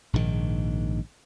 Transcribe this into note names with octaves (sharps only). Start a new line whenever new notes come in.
A#1 G#2 B2 D#3